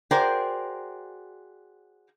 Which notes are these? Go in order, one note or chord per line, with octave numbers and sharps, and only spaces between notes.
F#4 G#4 A#4 C5 D5 G5